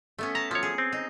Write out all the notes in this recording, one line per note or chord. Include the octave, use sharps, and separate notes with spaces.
A3 B3 C#4
A5 A#5
F3 F#3 C#5
G#4
C4
D#4